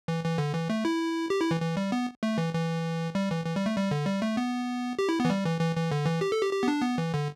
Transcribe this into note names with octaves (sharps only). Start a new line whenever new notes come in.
E3
E3
D3
E3
A3
E4
G4
E4
E3
E3
G3
B3
A3
E3
E3
G3
E3
E3
G3
A3
G3
D3
G3
A3
B3
G4
E4
B3
E3
G3
E3
E3
E3
D3
E3
G4
A4
G4
G4
B3
D4
B3
E3
D3